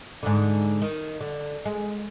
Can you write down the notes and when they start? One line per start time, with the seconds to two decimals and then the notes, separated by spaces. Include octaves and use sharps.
0.23 G#2 D3
0.82 D#3
1.21 D3
1.65 G#3